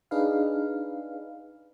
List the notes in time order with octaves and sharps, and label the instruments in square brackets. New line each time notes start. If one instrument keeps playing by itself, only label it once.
[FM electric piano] D4 D#4 G#4 B4 F5